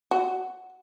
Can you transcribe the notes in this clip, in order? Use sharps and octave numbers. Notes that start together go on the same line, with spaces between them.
F#4